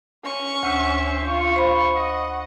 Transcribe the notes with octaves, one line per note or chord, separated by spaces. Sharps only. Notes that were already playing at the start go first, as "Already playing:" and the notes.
C#4 C#6
D2 C5 E5
F4 C#6
C5 B5
D#5 F#5 C#6